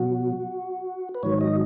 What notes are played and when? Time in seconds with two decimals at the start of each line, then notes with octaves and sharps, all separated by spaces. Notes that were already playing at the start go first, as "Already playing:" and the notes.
Already playing: B2 F#3 F#4
1.15 B4
1.23 G#2 D#3 F#3 C#5
1.41 D#5